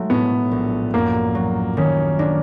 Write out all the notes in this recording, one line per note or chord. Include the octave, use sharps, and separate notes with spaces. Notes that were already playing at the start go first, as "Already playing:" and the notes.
Already playing: F#3 G#3 A3
A2 B3
A#1
F#2 A#3
F#3
D#3 C#4
A#3 D4